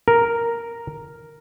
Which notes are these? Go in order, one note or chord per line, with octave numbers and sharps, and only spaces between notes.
A#4